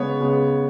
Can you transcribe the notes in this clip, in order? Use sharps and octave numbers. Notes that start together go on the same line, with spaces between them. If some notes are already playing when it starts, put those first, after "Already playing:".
Already playing: C#3 G#3 B3 C#5
C#3 G#3 B3